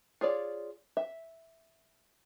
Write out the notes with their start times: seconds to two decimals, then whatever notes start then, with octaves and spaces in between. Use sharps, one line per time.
0.21 F4 G#4 C#5 D5
0.97 E5